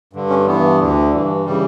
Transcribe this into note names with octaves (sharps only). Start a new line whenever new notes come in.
G2 D3
C#4
G2 E3 B3
D2 D3
G2 E3
C#3 E3 G3